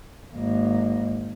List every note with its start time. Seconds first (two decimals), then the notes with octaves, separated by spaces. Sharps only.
0.34 G#1 A#3